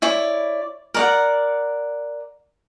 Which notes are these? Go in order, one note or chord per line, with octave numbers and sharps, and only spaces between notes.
E4 C#5 D5
A#4 D5 F#5